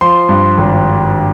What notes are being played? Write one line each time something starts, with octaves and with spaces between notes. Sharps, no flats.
F3 C6
G2
G#1